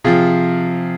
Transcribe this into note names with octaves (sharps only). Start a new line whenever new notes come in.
C3 F3 F4 G#4